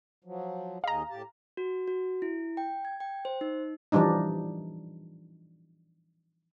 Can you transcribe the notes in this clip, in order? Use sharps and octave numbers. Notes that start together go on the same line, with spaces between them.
F3 F#3
D#2 G#4 D#5 F5 A#5
A2 G4 A5
F#4
F#4
E4
G5
G#6
G5
C5
D#4
E3 F3 G3 D4 D#4